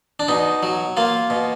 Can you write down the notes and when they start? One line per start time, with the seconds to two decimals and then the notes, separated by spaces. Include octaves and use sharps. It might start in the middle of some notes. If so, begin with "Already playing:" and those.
0.20 D4
0.28 B2 D#4
0.63 F#3
0.97 A#3 F4
1.30 B2